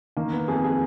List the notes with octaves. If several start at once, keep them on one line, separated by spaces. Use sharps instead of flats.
D#3 A#3
B3
F2 G#4
G#4